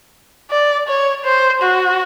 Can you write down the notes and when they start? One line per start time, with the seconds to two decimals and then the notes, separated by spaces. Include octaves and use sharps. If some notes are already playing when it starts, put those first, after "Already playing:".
0.51 D5
0.88 C#5
1.25 C5
1.62 F#4